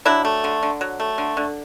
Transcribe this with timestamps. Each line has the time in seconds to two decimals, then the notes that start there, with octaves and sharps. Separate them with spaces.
0.05 F#3 D4 E4
0.25 A3
0.44 D3
0.63 D3
0.81 F#3
1.00 A3
1.18 D3
1.37 D3